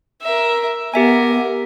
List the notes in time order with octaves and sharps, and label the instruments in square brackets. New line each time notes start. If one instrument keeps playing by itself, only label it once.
[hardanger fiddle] A#4 E5
[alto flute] B3 [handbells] G4 E5 G#5 [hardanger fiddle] A#4